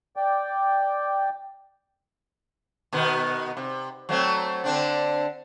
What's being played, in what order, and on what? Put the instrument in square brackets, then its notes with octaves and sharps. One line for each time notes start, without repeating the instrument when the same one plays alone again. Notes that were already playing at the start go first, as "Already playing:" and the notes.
[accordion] D5 G5
[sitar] B2 D#3 B3
C3
F#3 A3 C4
D3 C4 D4